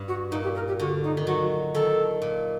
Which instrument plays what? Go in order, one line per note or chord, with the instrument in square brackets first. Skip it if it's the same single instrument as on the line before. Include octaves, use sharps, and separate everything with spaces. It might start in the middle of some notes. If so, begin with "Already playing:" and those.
Already playing: [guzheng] G2
[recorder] F#4
[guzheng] A#2 [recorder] D#4
[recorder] G4
A#4
G4
[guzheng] D3 [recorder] F#4
[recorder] D#4
[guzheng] D#3
[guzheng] F#3 [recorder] F#4
[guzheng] D#3 [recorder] A4
[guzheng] A#2